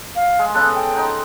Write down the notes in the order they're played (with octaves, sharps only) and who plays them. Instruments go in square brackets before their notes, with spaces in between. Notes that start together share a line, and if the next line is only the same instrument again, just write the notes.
[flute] F5
[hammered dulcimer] G#3
[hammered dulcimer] C#3 B3 A4 [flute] F#6
[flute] G5
[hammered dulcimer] D#4 F#5 C6